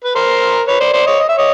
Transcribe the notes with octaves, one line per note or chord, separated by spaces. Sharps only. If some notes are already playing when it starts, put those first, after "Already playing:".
B4
A#4 C5
B4 C#5
C5 D5
C5 D5
C#5 D#5
D#5
E5
C#5 D#5